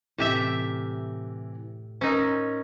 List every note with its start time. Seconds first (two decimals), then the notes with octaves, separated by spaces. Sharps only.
0.18 A2 C3 E3 G4 E5
2.01 C#4 D#4 A#4 C5 E6